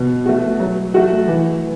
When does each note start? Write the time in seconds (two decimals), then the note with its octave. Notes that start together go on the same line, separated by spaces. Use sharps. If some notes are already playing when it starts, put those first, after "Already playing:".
Already playing: B2
0.26 A3 F#4
0.60 F#3
0.94 A3 F#4
1.27 E3